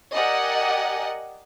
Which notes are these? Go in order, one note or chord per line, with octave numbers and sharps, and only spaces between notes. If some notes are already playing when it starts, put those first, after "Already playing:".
G4 A#4 D5 D#5 F#5 G#5